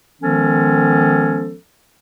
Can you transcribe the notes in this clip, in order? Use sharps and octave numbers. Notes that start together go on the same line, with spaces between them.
D#3 F3 G#3 B3 C#4 A4